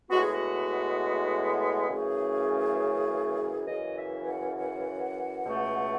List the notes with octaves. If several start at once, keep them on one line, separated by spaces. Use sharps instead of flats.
A2 G#3 B3 F#4
G#4
F#4
F#2 C#3 E3 A3 G#4
F#2 C#3 E3 D#5
E5
F#5
F#5
C#2 B2 A3